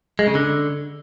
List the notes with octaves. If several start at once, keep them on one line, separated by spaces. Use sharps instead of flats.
G#3
C#3
D3